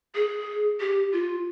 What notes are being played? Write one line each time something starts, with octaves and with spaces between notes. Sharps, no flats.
G#4
G4
F4